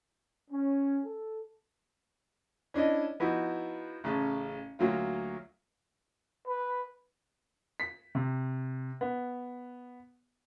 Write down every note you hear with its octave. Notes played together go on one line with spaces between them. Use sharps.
C#4
A4
C#4 D4 E4 D#5
F3 B3 D#4 E4 F#4
A1 C#3 A5
D2 F#3 A#3 F4
B4
B6
C3
B3